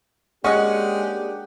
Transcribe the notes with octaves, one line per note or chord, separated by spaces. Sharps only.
G#3 A#3 C#4 D4 G4 D#5 F#5